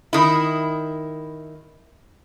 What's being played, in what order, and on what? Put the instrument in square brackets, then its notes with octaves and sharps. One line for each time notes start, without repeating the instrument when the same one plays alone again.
[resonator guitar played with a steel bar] D#3 E4